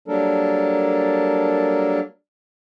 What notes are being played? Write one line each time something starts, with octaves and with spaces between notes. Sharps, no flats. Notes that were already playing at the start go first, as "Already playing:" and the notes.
F#3 G3 A#3 D4 A4 A#4